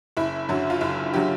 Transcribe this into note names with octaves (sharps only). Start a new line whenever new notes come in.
F#1 E4
F#2 D3 F#3
F4
F#1 E4
D3 F#3 G4